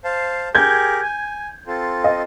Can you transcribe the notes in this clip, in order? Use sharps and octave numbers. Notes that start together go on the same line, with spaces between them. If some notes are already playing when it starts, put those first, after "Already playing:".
C5 F5 A5
G4 G#4 A#4 G6 G#6
G#5
C4 F4 A4
D#5